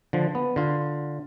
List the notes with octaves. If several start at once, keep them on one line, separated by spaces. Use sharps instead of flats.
D3 F3
B3
D3 F4